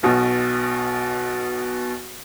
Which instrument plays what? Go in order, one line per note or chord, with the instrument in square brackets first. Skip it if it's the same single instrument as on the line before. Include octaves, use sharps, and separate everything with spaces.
[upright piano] B1 B2